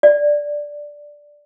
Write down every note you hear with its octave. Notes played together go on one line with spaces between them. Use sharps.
D5